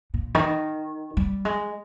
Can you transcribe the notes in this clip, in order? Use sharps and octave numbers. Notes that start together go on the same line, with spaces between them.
A#2
D#3
G3
G#3